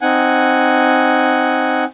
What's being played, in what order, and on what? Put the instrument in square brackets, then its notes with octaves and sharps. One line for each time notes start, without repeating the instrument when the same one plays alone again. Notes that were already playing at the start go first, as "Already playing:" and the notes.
[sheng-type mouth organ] C4 D#4 F#5 G#5